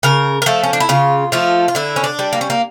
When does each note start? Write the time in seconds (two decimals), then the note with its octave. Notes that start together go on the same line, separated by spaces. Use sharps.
0.03 C#3 A#4
0.42 A#4
0.46 F3 A3 A4
0.63 C#4
0.73 D4
0.80 E4
0.89 C#3 F4
1.32 F3 A3 F4
1.68 F4
1.75 D3 E4
1.96 C#4
2.04 D4
2.19 G3
2.33 A#3
2.41 C#4
2.50 A#3